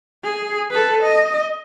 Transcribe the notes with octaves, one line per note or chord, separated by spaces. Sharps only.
G#4
A4 B4
D#5